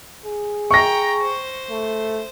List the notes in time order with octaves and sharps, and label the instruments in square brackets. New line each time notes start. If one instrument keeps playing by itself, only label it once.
[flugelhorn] G#4
[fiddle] G5 A#5 [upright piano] C#6 A#6
[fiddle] C5
[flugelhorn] A3